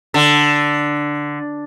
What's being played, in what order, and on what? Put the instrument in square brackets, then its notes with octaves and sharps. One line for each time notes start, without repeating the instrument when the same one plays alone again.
[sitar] D3